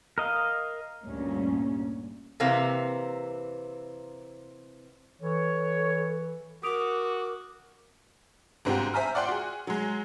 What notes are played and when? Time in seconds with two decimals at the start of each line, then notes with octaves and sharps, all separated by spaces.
0.18 A#4 D#5 F5
1.04 D2 G2 A#2 C#4
2.40 C3 E3 A#3 C4
5.21 E3 A4 C#5
6.63 F#4 A#4 D6 D#6 D7 F7
8.65 G1 G#2 C4 F#4 G4 G5
8.94 C5 E5 G#5 A#5 F6
9.15 D5 F#5 G5 C6 F#6
9.29 F#4 G#4
9.67 F#3 G#3